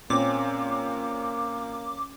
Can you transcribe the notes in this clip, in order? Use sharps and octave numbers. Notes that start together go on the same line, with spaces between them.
A#2 A#3 C4 C#4 D6